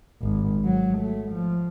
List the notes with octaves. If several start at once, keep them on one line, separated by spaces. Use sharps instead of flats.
G#1
F#3
A3
F3